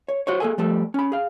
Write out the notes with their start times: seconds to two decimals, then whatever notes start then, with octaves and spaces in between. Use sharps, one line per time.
0.08 C#5
0.27 F#4 C5 C#5
0.40 A#3 G#4 A4 G#5
0.58 F3 G3 A3 A4
0.94 C#4 B5
1.12 G#4 F5